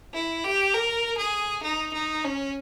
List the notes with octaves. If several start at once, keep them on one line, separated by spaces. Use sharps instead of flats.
E4
G4
A#4
G#4
D#4
D#4
C#4